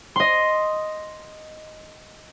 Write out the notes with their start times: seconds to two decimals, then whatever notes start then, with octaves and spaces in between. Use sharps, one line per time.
0.16 D#5 C6